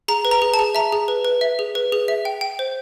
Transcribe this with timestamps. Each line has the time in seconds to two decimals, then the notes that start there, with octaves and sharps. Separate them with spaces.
0.08 G#4 A#5
0.25 B4
0.31 A#5
0.42 G#4
0.54 A5
0.59 G#4
0.75 E5 A#5
0.92 G#4
1.08 B4
1.25 B4
1.41 E5
1.59 G#4
1.75 B4
1.92 G#4
2.08 E5
2.25 G5
2.41 G5
2.59 C5